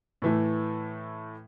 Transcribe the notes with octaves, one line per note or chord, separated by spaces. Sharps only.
A2 E3 A3